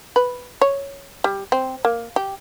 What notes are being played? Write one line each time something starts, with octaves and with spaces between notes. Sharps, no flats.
B4
C#5
G3
C4
A#3
G4